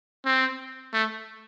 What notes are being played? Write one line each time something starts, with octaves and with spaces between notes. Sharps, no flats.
C4
A3